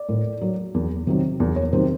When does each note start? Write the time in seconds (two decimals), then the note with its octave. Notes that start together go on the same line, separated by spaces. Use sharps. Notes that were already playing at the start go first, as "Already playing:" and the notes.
Already playing: D5
0.09 A2
0.41 F#3
0.74 E2
1.07 C3 D#3 F#3
1.40 E2
1.56 C#5
1.73 C3 D#3 F#3 C5